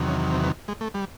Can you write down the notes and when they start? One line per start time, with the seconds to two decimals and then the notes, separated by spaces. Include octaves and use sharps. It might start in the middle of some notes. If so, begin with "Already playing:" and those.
Already playing: E2 C3 D#3 F#3
0.08 C#4
0.32 C4
0.43 B3
0.68 G#3
0.81 A3
0.94 G3